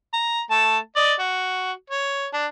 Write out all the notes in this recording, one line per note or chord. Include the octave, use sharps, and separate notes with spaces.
A#5
A3 A5
D5 D#5
F#4
C#5
D4